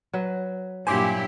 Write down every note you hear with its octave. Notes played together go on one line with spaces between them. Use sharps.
F#3 B4
G2 A#2 F#3 E4 G4 C5 G#5 D6